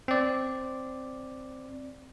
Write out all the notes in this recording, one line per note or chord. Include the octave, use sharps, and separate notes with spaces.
C4 D5